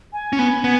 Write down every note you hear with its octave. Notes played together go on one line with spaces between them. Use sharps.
G#5
C#4
B3
B3